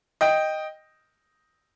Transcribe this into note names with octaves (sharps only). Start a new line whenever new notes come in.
D#5 G5